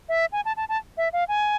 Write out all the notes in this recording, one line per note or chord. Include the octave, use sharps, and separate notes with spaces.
E5
G#5
A5
A5
A5
E5
F5
G#5